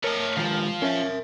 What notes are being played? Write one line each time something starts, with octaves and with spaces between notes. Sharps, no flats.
A3 A#4 C#5 D#5 A5
D#3 F3 G#3 F4
C#4 A#4 E5